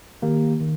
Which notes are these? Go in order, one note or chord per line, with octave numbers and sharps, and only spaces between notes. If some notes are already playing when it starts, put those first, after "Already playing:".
D#3 A#3 G4
D#3